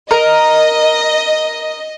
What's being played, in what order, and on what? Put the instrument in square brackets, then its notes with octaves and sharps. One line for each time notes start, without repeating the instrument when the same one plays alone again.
[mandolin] A#4 [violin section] D#5